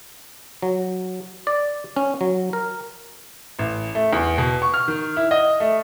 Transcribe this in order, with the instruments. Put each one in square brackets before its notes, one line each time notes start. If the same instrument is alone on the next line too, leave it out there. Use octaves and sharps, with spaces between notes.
[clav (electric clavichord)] F#3
D5
C#4
F#3
A#4
[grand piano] A1
A3
E2
B2
C#6
F6
D#3
E4
D#5
A3